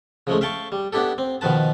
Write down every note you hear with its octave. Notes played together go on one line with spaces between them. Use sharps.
C#3 F3 G#3 A3
E5 F5 G5 A5 C#6
G3
B3 D4 E4 G4 A4
C4
B2 D#3 F3 B4 A5